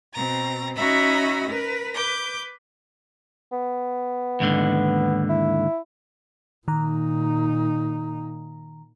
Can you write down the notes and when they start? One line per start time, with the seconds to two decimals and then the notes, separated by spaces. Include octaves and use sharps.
0.13 B2 C4 A#5 A6
0.75 C#4 D#4 F#4 E5 A#5 B5
1.48 A#4 B4
1.95 B4 D6 G6
3.52 B3
4.40 D#2 G#2 D3
5.29 E4
6.68 A#2 D#3 D#4 A#5